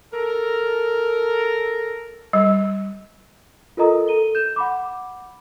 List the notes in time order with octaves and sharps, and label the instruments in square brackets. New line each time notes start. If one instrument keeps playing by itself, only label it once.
[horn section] A4 A#4
[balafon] G3
[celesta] F4 A4 A#4 D#5 A#5 D#6
A4 D#7 G7
G6 E7
F#5 B5 D6